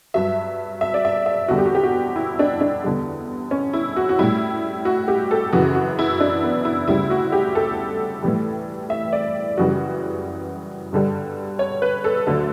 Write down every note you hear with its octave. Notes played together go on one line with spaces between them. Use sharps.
G2 F#3 E5
E5
D5
E5
E5
E2 D3 G3 F#4
G4
F#4
G4
F#4
E4
D4
D4
E2 D3 G3
C#4
E4
F#4
F#4
A2 G3 E4
F#4
G4
A4
F#2 C#3 E3 F#4
F#4
E4
D4
B3
E4
D2 C#3 G3 E4
F#4
G4
A4
A2 E3 G3
E5
D5
F#2 C#3 E3 G3 F#4
G2 D3 G3
C#5
B4
A4
D2 D3 F#3